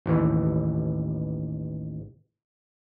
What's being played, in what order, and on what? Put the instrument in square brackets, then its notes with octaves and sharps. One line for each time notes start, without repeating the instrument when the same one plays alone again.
[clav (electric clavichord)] A1 D#2 E3